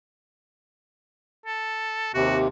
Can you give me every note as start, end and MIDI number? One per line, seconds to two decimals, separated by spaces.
1.46 2.14 69
2.14 2.48 39
2.14 2.48 48
2.14 2.37 66